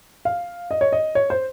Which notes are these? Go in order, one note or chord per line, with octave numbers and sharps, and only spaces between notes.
F5
D#5
C#5
D#5
C#5
C5